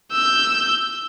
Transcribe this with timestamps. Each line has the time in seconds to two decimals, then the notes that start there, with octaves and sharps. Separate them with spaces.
0.12 E6 G6